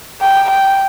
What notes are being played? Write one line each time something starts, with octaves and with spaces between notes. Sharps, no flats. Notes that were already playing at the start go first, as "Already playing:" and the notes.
G5
G5